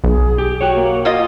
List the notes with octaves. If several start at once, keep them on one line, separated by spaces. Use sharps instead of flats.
B1 G#4
G4
F#4 C#5 G5
A#3
A#3 F4 F#4 D#5